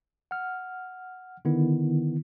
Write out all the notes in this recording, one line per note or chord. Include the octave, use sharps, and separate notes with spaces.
F#5 F6
D3 D#3 B3 E4